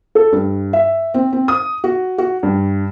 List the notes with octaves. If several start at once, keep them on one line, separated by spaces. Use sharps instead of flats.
A4
G2
E5
C4
C4
D#6
F#4
F#4
G2